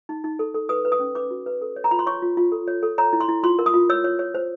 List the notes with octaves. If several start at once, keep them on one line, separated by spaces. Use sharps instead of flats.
D#4
D#4
A4
A4
B4 D#6
B4
D#6
C#4
B4 D6
F#4
B4
A4
C#5
A#5
F4 B5
C6
C#5 C#6
F4
F4
A4
C#5
A4
C#5 A#5
E4
C6
E4
F4 C6
A#4
D#6
F4
C#5 E6
C#5
C#5
C5